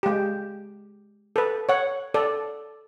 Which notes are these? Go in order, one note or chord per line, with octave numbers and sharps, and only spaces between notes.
G#3 G4
A4 B4
C#5 F#5
A4 D5